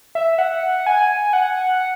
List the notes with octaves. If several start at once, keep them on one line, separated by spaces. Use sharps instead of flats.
E5
F#5
G#5
F#5